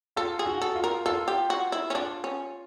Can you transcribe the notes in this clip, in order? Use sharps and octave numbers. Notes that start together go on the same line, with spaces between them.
F4 A4
G#4
F#4
A4
F4
A#4
F4 A4
G4
F#4
E4
C#4
D4 F4
C#4